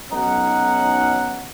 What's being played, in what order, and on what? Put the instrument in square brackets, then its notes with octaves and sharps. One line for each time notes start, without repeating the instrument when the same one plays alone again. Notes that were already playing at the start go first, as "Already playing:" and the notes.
[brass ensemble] B1 C#4 F#5 [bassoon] D#4